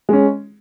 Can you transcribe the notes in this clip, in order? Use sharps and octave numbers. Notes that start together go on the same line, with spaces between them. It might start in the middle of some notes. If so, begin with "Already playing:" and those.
G#3 C#4